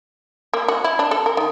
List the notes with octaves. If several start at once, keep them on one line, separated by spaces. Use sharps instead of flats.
A#3
F#4
E4
D4
A4
A#4
D#3